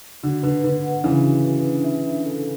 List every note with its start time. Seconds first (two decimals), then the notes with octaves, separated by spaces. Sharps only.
0.23 D3 F#4
0.43 D3 B4
0.64 D3 B4
0.83 F#5
1.04 C#3 E3 D4
1.24 F#4
1.44 B4
1.65 D4
1.84 E5
2.05 D4
2.25 A4